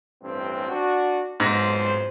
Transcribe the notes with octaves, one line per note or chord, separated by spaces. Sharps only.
A1 G2 C4
D4 F#4
B1 F2 G#2 C5 A#6